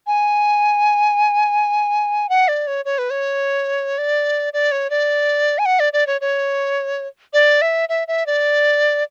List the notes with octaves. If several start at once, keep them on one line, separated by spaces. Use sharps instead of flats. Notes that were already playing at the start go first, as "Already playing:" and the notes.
G#5
F#5
D5
C#5
C#5
B4
C#5
D5
D5
C#5
D5
G#5
F#5
D5
D5
C#5
C#5
D5
E5
E5
E5
D5